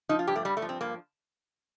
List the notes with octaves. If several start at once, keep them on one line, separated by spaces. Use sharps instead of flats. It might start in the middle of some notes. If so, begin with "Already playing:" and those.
F3 D#4
F4
G2 G4
A3
G2 G3
A3
F3
C4
G2 A#3